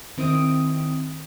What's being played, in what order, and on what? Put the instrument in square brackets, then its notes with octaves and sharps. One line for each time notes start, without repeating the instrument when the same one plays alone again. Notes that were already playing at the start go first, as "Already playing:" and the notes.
[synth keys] D#3 C4 E4 D#6 D7